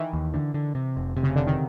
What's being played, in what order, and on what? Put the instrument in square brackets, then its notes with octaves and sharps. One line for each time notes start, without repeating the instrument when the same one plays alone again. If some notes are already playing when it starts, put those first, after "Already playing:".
Already playing: [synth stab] D#3 E3
[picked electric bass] D#2
D3
D3
C3
F1
C3
[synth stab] C#3
[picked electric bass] F1 [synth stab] D3
[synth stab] D#3